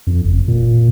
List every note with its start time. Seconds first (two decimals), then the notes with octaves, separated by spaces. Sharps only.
0.07 F2
0.25 F#1
0.48 A#2